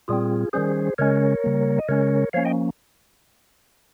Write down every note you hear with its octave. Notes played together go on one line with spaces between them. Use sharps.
A#2 G3 C4 F4 G#4
D#3 G3 C#4 G#4 C5
C#3 G#3 C#4 A#4 C#5
C#3 G3 A#3
D#5
C#3 G#3 C#4 A#4 C#5
F3 A#3 C#4 C#5 F5
D#5 G5